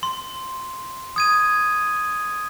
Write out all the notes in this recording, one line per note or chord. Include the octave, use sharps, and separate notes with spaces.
C6
D#6 G#6 D#7